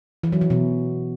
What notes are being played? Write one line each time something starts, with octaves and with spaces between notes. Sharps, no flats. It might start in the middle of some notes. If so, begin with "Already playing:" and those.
E3
F#3
E3
B2